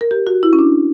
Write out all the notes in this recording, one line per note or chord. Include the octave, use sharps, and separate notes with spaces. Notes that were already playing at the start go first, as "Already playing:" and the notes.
A#4
G4
F#4
E4
C#4
D4